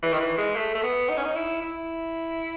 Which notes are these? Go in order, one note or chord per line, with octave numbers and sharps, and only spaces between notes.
E3
D#3
E3
G#3
A3
A3
B3
D#4
C#4
D#4
E4
E4